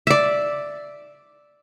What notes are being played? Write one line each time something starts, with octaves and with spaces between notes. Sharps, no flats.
D5 E5